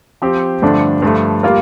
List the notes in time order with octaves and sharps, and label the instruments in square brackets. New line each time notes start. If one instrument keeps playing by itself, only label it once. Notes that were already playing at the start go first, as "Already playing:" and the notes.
[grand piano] F3 C4 G4 C5
G2 D3 F3 A3 D4
G2 F3 A3
G3 A#3 F4 A#4